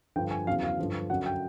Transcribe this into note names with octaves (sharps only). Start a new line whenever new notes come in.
G2 D3 F3 G5
G#5
E2 C#3 F#3 F5
F5
G2 D3 F3
F#2 D3 F#3 F#5
G5